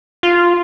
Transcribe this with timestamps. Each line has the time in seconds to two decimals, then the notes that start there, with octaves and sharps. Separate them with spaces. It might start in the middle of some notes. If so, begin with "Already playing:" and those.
0.23 F4